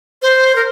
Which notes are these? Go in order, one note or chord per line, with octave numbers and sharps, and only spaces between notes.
C5
A#4